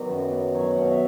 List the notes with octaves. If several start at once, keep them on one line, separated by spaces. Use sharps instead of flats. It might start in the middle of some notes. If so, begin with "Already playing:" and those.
Already playing: D#3 F#3 B3 D5
F#2
B3
F#3 C#5
F#5
B2 F5
E5